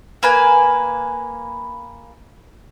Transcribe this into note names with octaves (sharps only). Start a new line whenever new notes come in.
A#3 B4 G#5